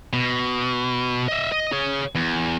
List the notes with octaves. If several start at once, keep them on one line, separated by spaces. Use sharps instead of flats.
B2
D#5 E5
D#5
G#4 C#5
E2